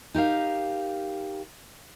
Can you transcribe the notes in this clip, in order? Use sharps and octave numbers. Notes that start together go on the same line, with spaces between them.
D#4 G4 A#4 F5